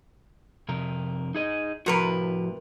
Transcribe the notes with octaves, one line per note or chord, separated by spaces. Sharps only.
F2 C3 A#4
D#4 G#4 D#5
A2 C3 F3 F#4 A#4 B4